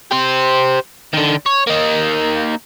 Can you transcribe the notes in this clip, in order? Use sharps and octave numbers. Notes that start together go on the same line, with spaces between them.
G4 C5
D3 D#3
C#5
A#3 D#4